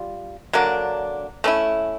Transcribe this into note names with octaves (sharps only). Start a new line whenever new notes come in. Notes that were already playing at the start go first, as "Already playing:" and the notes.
Already playing: G3 F4
D3 F#3 A#3 D4
A3 C#4 E4